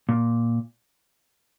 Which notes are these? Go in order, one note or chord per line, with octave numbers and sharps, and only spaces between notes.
A#2